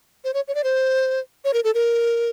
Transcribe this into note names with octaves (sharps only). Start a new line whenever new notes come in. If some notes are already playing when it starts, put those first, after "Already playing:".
C5
C#5
C#5
D5
C5
C#5
A#4
A4
A#4